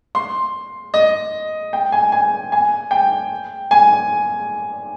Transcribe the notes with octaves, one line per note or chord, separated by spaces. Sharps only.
C6
D#5
G5
G#5
G#5
G#5
G5
G#5